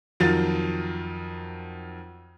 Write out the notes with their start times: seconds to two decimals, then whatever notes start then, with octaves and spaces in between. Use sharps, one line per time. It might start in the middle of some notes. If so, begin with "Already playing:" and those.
0.20 F2 D#3 F#3 F4 A6